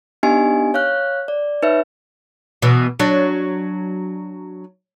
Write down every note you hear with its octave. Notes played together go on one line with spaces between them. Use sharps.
B3 D4 D#4 G4 D#5 G#5
C#5 F5 F6 F#6
D5
D#4 B4 C#5 E5
B2 E3
F#3 D4